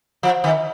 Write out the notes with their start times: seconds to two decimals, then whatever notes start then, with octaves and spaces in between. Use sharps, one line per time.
0.23 F3
0.44 D#3